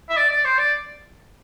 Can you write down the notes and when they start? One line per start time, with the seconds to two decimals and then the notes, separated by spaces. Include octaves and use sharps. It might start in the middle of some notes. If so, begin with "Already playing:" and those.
0.10 E5
0.17 D5
0.31 D5
0.45 C5
0.59 D5